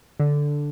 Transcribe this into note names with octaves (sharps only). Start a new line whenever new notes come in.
D3